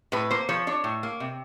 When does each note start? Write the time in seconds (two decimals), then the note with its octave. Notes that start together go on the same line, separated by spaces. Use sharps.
0.12 A2 B4
0.31 A#3 C5
0.49 F3 C#5
0.67 D4 C#5
0.84 A2
1.03 A#3
1.20 C3